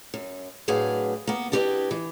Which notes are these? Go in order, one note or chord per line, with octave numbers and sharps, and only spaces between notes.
F#2
A2 F#3 D4 G#4 B4 F5
A#3 B3
D4 E4 G4 B4 D#5
E3